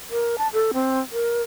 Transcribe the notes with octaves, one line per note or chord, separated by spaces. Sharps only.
A#4
A5
A4
C4
A#4